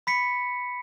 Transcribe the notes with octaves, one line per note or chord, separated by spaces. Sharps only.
B5 B6 C#7